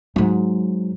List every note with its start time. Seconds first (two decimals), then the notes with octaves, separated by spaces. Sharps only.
0.16 G#2 F#3